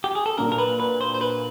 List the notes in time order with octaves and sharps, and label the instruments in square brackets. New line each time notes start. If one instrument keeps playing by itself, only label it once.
[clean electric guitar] G4
G#4
A4
[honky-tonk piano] A#2 F#3 A#3 D4 [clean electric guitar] A#4
[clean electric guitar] A#4
B4
B4
C5
C5
B4